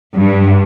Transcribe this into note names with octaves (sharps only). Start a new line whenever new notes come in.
G2